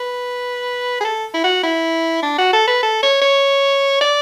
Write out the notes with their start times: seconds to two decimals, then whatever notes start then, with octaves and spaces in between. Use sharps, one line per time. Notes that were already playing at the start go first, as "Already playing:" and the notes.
Already playing: B4
1.00 G#4
1.04 A4
1.34 E4
1.44 F#4
1.63 E4
2.22 D4
2.38 F#4
2.53 A4
2.67 B4
2.82 A4
3.03 C#5
3.21 C#5
4.01 D5